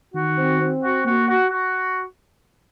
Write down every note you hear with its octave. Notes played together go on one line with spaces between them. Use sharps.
D#3 F#4
C4
C4
F#4
A#3 F#4
F#4
F#4